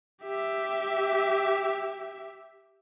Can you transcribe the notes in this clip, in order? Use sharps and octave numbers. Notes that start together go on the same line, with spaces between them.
G4 E5